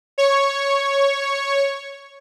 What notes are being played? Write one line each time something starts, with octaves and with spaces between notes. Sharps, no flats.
C#5 C#6